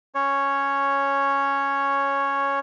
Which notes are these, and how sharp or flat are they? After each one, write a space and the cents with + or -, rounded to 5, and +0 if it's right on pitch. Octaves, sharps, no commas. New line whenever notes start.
C#4 +0 C#5 +0